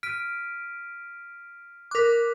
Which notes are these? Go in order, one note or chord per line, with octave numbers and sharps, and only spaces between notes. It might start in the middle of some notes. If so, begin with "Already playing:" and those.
F6 B6 D7 D#7
A#4 D6 F#6 B6